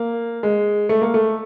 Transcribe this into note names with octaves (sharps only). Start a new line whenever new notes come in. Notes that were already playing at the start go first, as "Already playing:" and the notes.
Already playing: A#3
G#3
A3
A#3
A3